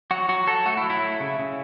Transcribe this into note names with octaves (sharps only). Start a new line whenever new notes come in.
F#3 F#4
F#3 F#4
F#3 A4
A3 F#4
E4
F#3
E4
A3
C#3
C#3